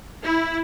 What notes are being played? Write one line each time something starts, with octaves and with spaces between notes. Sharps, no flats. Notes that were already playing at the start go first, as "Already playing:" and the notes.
E4